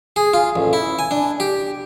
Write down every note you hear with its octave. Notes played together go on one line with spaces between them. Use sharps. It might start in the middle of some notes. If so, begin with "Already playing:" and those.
G#4
F4
A1
E4
G#5
D4
G4